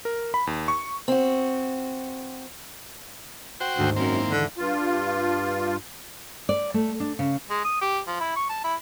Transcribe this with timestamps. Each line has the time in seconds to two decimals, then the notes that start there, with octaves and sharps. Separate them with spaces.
0.05 A#4
0.34 B5
0.47 D#2
0.68 C#6
1.08 C4 F#4
3.60 F#4 C5 G5
3.78 D2 G#2 D#3
3.96 F#2 A#3 C4
4.12 E4
4.31 E1 D3
4.58 G2 F4
6.49 D5
6.74 A3
7.00 D4
7.19 C#3
7.50 G#3
7.65 D#6
7.81 G4
8.07 F3
8.20 E4
8.36 C#6
8.49 A5
8.64 E4